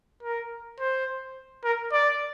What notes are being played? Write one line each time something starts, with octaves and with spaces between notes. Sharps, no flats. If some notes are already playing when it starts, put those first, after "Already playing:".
A#4
C5
A#4
D5